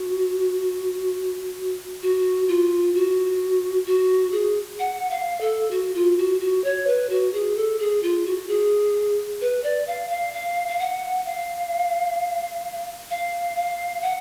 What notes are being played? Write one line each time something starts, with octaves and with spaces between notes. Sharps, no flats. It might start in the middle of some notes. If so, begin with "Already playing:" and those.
Already playing: F#4
F#4
F4
F#4
F#4
G#4
F#5
F5
A4
F#4
F4
F#4
F#4
C#5
B4
F#4
G#4
A4
G#4
F4
F#4
G#4
B4
D5
F5
F5
F5
F5
F#5
F5
F5
F5
F#5